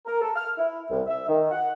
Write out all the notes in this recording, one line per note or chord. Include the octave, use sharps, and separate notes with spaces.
A#4
A4
F6
E4
C2
E5
D#3
F#5